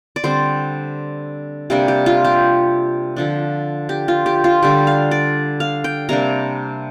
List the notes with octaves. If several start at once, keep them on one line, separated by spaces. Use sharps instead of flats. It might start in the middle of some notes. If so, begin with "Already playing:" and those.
D5
D3 G3 C4 C5
C3 G3 A#3 D4 G4
G4
F4
G4
D3 F3 D4
G4
F4
G4
F4
D3 G3 D4 G4
F5
D5
F5
G5
C3 G3 A#3 D4 A#5